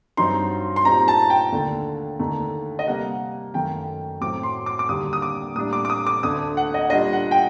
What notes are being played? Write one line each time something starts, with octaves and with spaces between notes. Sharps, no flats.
G2 F#3 C4 D#4 C6
C6
A#2 G3 C4 D#4 A#5
A5
G5
D#2 D3 A3
D#2 D3 A3 D#4
D#5
C3 G3 A#3 F#5
F#2 D#3 A3 G5
A2 F#3 C4 D6
C6
D6
D6
D#2 D3 G3 A#3 D#6
D#6
D6
A2 G3 A#3 D4 D#6
D6
D6
D#6
D6
D2 D3 A3 D#6
F#5
D#5
A#2 G3 D4 D#5
F#5
G5